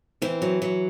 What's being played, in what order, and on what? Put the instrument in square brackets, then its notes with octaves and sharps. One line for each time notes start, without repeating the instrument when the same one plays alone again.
[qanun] E3 [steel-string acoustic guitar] C4
[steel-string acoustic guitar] F#3
F#3